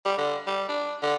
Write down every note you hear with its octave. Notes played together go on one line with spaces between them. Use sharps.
G3
D3
G3
D4
D3